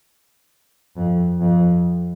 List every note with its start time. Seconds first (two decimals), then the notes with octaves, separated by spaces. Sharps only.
0.97 F2
1.41 F2